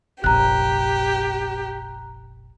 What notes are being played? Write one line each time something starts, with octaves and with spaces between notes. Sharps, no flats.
F1 A#1 G4 A#5 F#6